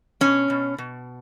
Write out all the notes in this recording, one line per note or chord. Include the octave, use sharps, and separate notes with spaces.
B2 C#4
B2
B2